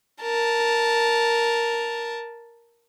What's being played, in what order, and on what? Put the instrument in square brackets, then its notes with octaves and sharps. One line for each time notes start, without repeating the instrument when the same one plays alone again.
[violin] A#4 A5